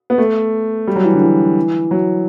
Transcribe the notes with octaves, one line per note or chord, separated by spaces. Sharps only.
B3
A3
G3
F#3
E3
D3
E3
F#3